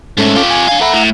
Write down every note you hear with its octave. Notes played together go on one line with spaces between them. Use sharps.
G#2 A3 C#4 A4
F4 G4
G#5
D4 F5
A4 E5 F#5 A#5 B5
A2